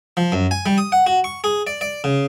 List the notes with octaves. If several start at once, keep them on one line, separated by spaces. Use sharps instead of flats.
F3
F#2
G#5
G3
D#6
F#5
F#4
C#6
G#4
D5
D5
C#3